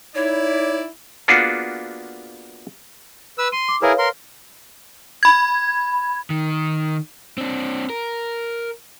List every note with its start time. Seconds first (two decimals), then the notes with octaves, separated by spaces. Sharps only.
0.15 D#4 E4 C#5 D5
1.28 A#3 B3 D4 F4 F#4 G#4
3.38 B4 E6
3.52 C6 D#7
3.68 D6
3.82 E4 G#4 A#4 B4 C#5 F5
3.98 A#4 C6
5.23 B5 G#6
6.30 D#3
7.38 C4 D4
7.90 A#4